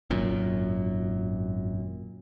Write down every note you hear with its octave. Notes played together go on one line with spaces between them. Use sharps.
G#1 F#2 A#2